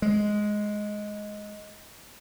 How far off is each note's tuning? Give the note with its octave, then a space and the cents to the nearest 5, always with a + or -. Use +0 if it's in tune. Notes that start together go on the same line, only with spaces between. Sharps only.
G#3 +5